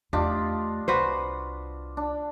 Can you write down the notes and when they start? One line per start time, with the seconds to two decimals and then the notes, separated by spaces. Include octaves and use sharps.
0.13 E2 A3 D4 F4 G4 D#5
0.88 C2 F#4 B4 C5
1.97 D4